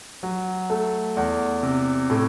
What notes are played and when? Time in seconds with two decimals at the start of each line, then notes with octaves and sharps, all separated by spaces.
0.23 F#3
0.70 A3
1.17 E2
1.63 C3
2.10 A2